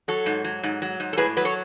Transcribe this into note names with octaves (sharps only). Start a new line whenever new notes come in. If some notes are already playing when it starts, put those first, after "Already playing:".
F#3 A4 C#5
G#2
F#3
G#2
F#3
G#2
A4
A2 G#4 B4
F#3 B4
A4 C#5